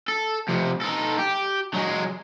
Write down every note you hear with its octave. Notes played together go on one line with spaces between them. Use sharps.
A4
F2 C3
D#4 A4
G4
F#3 G#3